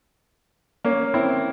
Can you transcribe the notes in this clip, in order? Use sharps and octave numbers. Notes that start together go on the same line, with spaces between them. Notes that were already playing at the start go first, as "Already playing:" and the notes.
A#3 C#4
C4 E4